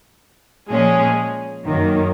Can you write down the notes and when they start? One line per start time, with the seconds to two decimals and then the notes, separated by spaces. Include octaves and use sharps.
0.69 A#2 F3 G#3 C#4 G#4
1.65 F#2 D#3 F#3 A#3